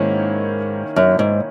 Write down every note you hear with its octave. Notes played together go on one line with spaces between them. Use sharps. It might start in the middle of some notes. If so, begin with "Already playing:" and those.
Already playing: G#2 D#3 A#3 C#4 E4
F#2
G#2